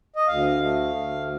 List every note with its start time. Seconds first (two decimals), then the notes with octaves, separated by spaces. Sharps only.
0.16 D#5
0.28 D2 F5
0.62 A3
0.95 D2